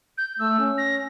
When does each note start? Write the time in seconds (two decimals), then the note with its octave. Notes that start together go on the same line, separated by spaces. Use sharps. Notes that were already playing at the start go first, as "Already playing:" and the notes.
0.18 G6
0.39 A3 E6
0.59 C#4
0.78 A#6